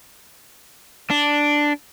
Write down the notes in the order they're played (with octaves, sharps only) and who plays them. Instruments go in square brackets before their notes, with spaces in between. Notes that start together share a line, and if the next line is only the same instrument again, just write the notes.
[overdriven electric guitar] D4